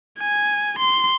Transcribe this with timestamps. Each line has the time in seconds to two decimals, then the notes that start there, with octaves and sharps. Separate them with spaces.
0.19 G#5
0.79 C6